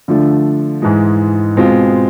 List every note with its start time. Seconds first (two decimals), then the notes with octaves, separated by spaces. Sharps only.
0.08 D3 F3 A3 D4
0.82 G#2 E3 G#3
1.56 B2 G#3 C4 F4